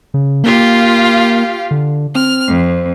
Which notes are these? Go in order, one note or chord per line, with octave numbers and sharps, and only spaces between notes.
C#3
A#3 F4 G4 F5
D3
C4 F6
F2